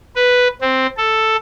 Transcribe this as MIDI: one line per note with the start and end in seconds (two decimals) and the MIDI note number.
0.16 0.48 71
0.62 0.87 60
0.97 1.36 69